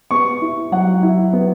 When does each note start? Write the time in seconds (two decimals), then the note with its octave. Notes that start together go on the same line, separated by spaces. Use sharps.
0.11 B3 C#6
0.42 E4
0.72 F#3 F#5
1.03 E4
1.33 B3